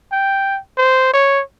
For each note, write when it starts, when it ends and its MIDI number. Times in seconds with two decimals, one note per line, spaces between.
0.12 0.60 79
0.78 1.11 72
1.14 1.42 73